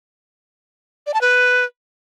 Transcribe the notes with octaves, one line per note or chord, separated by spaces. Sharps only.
D5
A5
B4